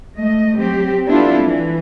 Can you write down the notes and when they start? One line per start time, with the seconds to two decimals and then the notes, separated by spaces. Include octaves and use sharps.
0.16 A3 D#5
0.60 F#3 C4 G4
1.07 B3 C4 D4 E4 F4 A4
1.42 E3